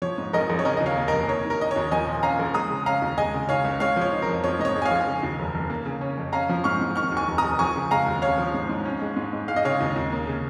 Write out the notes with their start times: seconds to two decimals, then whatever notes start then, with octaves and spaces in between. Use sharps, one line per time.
0.02 F3 C#5
0.18 G#2
0.33 A#1 A#4 D#5
0.50 A#1
0.59 C#5
0.65 C#3 A#4 D#5
0.77 D#2 D#5
0.86 C#5 F5
0.97 A#3
1.08 A#4 D#5
1.13 F1
1.21 A#4
1.28 A#3 C#5
1.45 D#3
1.50 A#4
1.60 D#4 D#5
1.71 C#5
1.76 D#2
1.91 F3 D#5 G#5
2.07 A#2
2.23 C#4 F5 A#5
2.39 A#1
2.54 G#3 A#5 D#6
2.70 C#3
2.86 C#4 F5 A#5
3.02 D#2
3.18 G#3 D#5 G#5
3.34 C#3
3.49 D#4 C#5 F5
3.65 C#2
3.80 G#3 C#5 F5
3.96 F3
4.02 C#5
4.12 D#4
4.22 A#4
4.28 F2
4.44 F3 C#5
4.59 G#2 D#5
4.65 C#5
4.76 G#3
4.82 G#5
4.85 C#5 F5
4.91 A#1
5.07 C#3
5.23 D#2
5.39 F1
5.55 F1
5.70 A#3
5.86 C#3
6.01 C#4
6.18 F2
6.33 C#4 F5 A#5
6.49 F3
6.64 G#2 C#6 F6
6.81 G#2
6.96 D#3 C#6 F6
7.12 D#2 G#5 C#6
7.27 F1
7.38 A#5 D#6
7.44 F1
7.59 F3 G#5 C#6
7.75 C#3
7.91 G#3 F5 A#5
8.07 D#2
8.22 C#4 C#5 F5
8.38 F3
8.54 G#2
8.69 G#2
8.85 C#4
9.02 G#3
9.16 G#2
9.33 G#2
9.48 G#3 F5
9.56 D#5
9.65 C#3 C#5 F5
9.80 D#2
9.96 D#2
10.12 A#3
10.27 C#3